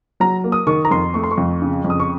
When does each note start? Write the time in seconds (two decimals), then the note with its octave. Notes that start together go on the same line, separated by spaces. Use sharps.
0.20 F#3 A#5
0.44 A#3
0.52 D#6
0.67 D#3 C#6
0.85 A#5
0.91 F2 C6
1.14 A3 C#6
1.24 C6
1.31 C#6
1.38 F2
1.62 C#3
1.84 F2
1.90 D#6
2.00 C#6